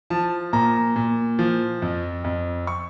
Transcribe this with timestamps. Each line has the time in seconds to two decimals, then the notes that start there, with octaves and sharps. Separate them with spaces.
0.10 F3 A5
0.53 A#2 A#5
0.96 A#2
1.39 F3
1.82 F2
2.24 F2
2.67 C#6